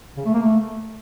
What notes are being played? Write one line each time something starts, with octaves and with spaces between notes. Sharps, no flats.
C#3
A3
A#3
A3